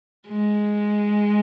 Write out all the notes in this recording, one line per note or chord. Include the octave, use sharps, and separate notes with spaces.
G#3